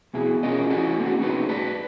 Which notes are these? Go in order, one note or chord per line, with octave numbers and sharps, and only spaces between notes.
B1 B2 E4 G#4
C#4 F4 A#4 D5 D#5
C#4 E4 F#4 A4 G#5
A#3 C4 C#4 F#4
A#3 D#4 F#4 G#4 B4
B4 D5 A5